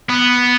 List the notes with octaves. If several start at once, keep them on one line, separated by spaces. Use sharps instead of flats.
B3